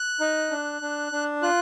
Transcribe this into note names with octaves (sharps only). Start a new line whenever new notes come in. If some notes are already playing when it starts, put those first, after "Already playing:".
Already playing: F#6
D#4
D4
D4
D4
F4 F#6